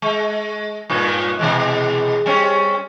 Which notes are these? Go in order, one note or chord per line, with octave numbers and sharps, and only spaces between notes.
G#3
G2 A#2 B4
B2 E3 G#3
G3 C4 C#4